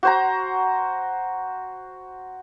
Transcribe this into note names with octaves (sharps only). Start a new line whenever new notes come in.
F#4 C5 A#5